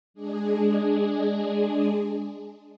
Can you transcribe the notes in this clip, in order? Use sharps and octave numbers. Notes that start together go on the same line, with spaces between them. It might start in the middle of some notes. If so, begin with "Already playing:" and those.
G#3 D4 G#4